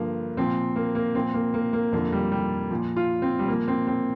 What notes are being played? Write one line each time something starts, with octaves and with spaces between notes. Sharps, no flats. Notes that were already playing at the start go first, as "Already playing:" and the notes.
Already playing: G2 D3 F3 A#3
A#2 F3 C4
A#3
A#3
A#2 F3 C4
A#3
A#3
A#3
F2 D3 F3 A#3
G3
G3
A#2 F3
F4
C4
G3
A#2 F3 A#3
C4
C4